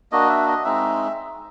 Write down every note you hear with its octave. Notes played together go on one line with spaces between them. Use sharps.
A#3 D4 F#4 D#5
E5
D#5
G#3 C4 D#4 E5